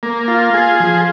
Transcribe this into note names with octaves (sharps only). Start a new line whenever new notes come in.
A#3
F4
G#4
F3